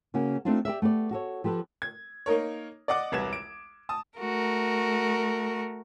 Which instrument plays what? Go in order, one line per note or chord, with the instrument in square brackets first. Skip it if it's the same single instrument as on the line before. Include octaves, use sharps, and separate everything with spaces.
[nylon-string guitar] C#3 A#3 C#4 F#4
A3 C4 D4 D#4 F4
G4 A#4 D5 E5
A3 B3 G4 D5
F#4 A4 C#5
F3 G4 A4 B4
[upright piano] G#6
A#3 D#4 A#4 C#5
D5 D#5 F#5 D6
E1 C2 B4 G#6 E7
D7
A5 D#6
[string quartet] A3 F#4 A#4